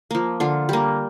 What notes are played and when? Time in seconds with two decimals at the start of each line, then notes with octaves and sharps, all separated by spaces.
0.11 F3 A#3
0.40 D3 F4
0.69 G3 A#3